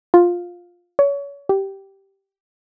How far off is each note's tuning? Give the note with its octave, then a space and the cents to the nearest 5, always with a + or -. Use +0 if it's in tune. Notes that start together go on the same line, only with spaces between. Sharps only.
F4 +10
C#5 +30
G4 -10